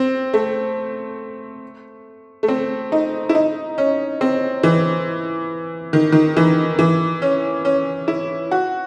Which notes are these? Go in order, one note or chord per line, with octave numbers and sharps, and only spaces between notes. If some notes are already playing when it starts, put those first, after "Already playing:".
Already playing: C4
A3
A3
C4
D#4
E4
D#4
C#4
C4
E3
D#3
D#3
E3
E3
C#4
C#4
E4
F#4